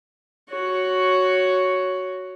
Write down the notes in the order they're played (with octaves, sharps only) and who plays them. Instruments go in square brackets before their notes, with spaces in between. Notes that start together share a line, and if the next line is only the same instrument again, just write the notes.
[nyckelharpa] F#4 C#5